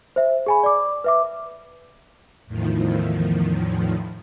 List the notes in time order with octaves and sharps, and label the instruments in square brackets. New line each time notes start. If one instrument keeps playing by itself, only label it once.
[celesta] C5 E5
G#4 G#5 B5
D5 D6
B4 E5 D6
[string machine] E2 A2 D#3 F3